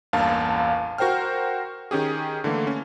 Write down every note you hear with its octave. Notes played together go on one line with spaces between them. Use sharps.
A1 E2 G2 A#3 F5 A5
F#4 A#4 C5 G5 F6
D#3 C#4 G4 G#4
D3 E3 A3 A#3
C#4